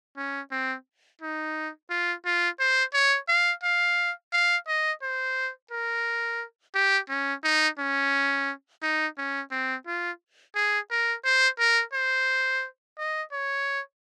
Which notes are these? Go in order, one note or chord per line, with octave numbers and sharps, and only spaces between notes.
C#4
C4
D#4
F4
F4
C5
C#5
F5
F5
F5
D#5
C5
A#4
G4
C#4
D#4
C#4
D#4
C#4
C4
F4
G#4
A#4
C5
A#4
C5
D#5
C#5